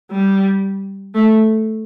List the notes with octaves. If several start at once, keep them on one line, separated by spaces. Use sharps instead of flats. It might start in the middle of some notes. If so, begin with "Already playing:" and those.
G3
A3